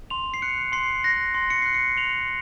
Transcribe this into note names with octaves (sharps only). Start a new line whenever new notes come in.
C6 F7
C7
F#6 C#7
C6 C7
F#6 A#6
C6
C#7
F#6 C7
C#7
C6 F7